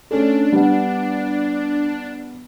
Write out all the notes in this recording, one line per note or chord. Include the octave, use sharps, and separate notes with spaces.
A3 C#4 D4 A4
G3 B3